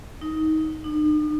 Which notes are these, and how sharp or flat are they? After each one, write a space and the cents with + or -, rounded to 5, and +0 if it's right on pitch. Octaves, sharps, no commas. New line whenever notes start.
D#4 +15
D#4 -45